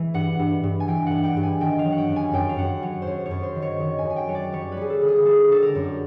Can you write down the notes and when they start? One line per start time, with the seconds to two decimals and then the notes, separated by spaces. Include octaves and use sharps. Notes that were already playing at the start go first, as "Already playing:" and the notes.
Already playing: E3
0.14 G2 F#5
0.39 G2
0.64 G2
0.80 G#5
0.87 E3 G5
1.07 G2 F#5
1.24 G5
1.37 G2
1.43 G#5
1.61 D#3 G5
1.79 F5
1.85 F#3
1.92 F#5
1.98 G5
2.09 F#2
2.16 G#5
2.33 F#2 G5
2.49 F5
2.58 F#2 F#5
2.82 F#3 C#5
3.02 C5
3.07 F#2 C#5
3.26 C#5
3.31 F#2
3.43 C5
3.55 D#3
3.62 C#5
3.80 D#3
3.98 G#5
4.05 F#2
4.10 G#5
4.16 G5
4.29 F#3 C#5
4.35 D5
4.52 G3 C#5
4.72 B4
4.77 G3 G#4
4.90 A4
5.02 D3
5.08 G#4
5.26 G3 A4
5.51 D3 A4
5.62 A#4
5.75 F#2